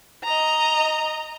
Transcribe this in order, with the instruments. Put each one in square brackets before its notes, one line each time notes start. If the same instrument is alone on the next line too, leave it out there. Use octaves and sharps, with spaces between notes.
[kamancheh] D#5 A#5